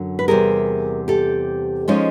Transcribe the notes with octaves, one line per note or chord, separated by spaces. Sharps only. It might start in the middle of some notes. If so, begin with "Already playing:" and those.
Already playing: F#2 D3 F#3
B4
E2 C3 D#3 G3 G#4 A#4
G4 A4
F3 G#3 C#4 D#4